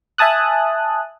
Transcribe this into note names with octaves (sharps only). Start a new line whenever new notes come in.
E5 G#5 A5 D#6 F#6